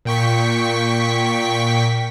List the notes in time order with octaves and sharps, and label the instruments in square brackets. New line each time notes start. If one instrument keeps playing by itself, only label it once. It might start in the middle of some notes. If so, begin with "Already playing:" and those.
[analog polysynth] A#2 G5 C#6 B6